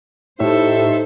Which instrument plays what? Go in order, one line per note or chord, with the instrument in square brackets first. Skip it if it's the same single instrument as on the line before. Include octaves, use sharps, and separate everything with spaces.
[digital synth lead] A2 [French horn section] D#4 G4 [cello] A4 C5 [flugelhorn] E5